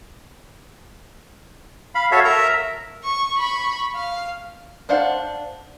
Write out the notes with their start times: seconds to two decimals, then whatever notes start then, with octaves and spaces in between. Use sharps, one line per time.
1.95 F5 B5
2.12 F#4 A4 C#5 E5 F5
2.25 A#4 E5 A#5
3.05 C#6
3.38 B5 C#6
3.95 F5
4.89 D4 C5 F5 F#5